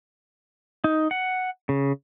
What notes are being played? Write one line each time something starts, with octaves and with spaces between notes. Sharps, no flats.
D#4
F#5
C#3